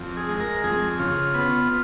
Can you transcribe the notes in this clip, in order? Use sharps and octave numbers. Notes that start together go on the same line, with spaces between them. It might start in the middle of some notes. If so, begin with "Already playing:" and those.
Already playing: F2
G#4
G#3
A#4
F2 G#4
C#3 F4
B3